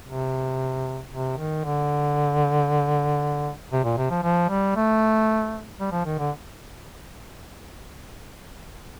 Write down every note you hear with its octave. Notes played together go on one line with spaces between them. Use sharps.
C3
C3
D#3
D3
C3
A#2
C3
F3
F3
G3
A3
G3
F3
D#3
D3